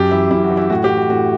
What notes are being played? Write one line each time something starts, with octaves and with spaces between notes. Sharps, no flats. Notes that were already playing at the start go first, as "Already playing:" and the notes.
Already playing: F#2 G4
E3 E4
F#2 E4
F#4
E3
E4
A2 F#4
G4
E3
F#4
A2 F#4